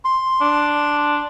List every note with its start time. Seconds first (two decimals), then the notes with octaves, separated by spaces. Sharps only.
0.05 C6
0.41 D4